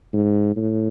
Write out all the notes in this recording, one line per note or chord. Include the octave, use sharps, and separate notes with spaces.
G#2
A2